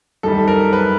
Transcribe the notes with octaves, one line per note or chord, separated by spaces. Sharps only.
F#2 D#3 G3 A4
A#4
B4